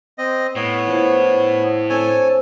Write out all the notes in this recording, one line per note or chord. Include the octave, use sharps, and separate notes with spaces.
C4 D#5
A2 B3 C#5
F3 D4 E4
C4 D4 A4 C#5 G#5